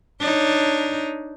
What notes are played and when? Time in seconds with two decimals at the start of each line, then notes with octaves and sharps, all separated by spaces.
0.20 D4 D#4 C#5